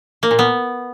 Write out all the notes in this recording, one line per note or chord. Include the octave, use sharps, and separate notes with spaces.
A#3
A#2
B3